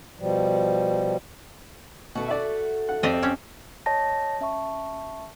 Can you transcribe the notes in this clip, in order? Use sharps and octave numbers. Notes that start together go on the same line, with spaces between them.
B2 F3 G3
B2 A3 F#4
D5 E5
F#5
F2 C4 G4 D5 D#5
C#4 G4
C#5 D#5 A5 A#6
C#4 E5 A5 C#6